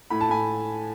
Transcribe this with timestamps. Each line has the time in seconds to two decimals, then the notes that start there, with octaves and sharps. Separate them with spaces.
0.10 A2 B5
0.21 A5
0.29 A2 G#5 B5